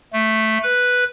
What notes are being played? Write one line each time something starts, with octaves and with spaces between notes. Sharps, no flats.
A3
B4